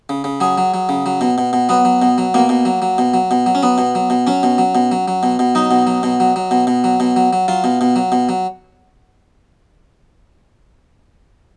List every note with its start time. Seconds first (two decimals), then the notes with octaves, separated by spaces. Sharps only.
0.09 C#3
0.24 C#3
0.40 F#3 G#4
0.58 F#3
0.74 F#3
0.89 C#3
1.06 F#3
1.21 B2
1.38 B2
1.53 B2
1.69 F#3 B3
1.85 F#3
2.02 B2
2.18 F#3
2.34 B2 A#3
2.49 B2
2.65 F#3
2.82 F#3
2.98 B2
3.14 F#3
3.31 B2
3.46 F#3
3.55 C#4
3.63 F#3 B3
3.78 B2
3.95 F#3
4.10 B2
4.27 F#3 C#4
4.43 B2
4.58 F#3
4.75 B2
4.92 F#3
5.08 F#3
5.23 B2
5.39 B2
5.55 F#3 D#4
5.71 B2
5.87 F#3
6.03 B2
6.20 F#3
6.36 F#3
6.51 B2
6.67 B2
6.84 F#3
7.00 B2
7.16 F#3
7.33 F#3
7.48 F#3 F4
7.64 B2
7.81 B2
7.96 F#3
8.12 B2
8.29 F#3